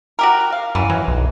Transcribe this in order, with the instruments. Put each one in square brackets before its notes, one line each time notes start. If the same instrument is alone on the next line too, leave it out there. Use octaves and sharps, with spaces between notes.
[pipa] F#4 G4 A#4
F5
[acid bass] F#2 [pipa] E3
[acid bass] E3 [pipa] F#3
[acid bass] B1